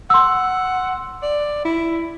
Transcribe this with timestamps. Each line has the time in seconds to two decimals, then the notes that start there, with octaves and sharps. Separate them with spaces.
0.10 F#5 C6 E6
1.22 D5
1.65 E4